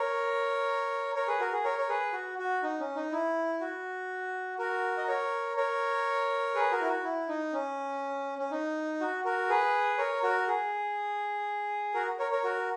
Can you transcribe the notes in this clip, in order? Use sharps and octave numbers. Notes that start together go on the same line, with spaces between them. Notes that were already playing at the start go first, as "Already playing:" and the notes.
Already playing: A#4 C#5
A#4 C#5
G#4 B4
F#4 A#4
G#4
A#4 C#5
C#5
G#4 B4
F#4
F#4
D#4
C#4
D#4
E4
F#4
F#4 A#4
D#5
A#4 C#5
A#4 C#5
G#4 B4
F#4 A#4
E4
F#4
E4
D#4
C#4
C#4
D#4
F#4
F#4 A#4
G#4 B4
A#4 C#5
F#4 A#4
G#4
F#4 A#4
A#4 C#5
A#4 C#5
F#4 A#4